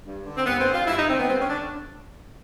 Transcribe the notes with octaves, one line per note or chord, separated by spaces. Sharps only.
G2
D3
C4
G2 B3
C4
D3
F4
G2 E4
D#4
D3 C4
B3
G2 C4
C#4
D3 D4